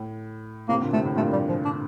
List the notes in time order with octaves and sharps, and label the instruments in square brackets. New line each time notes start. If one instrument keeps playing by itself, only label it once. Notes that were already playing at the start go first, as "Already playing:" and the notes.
Already playing: [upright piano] A2
[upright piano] A2 C3 [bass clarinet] A#3
[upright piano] A#2 D3
[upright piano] A2 C3 [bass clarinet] A3
[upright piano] A2
[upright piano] G2 A#2 [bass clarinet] A3
[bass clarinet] G3
F3
D4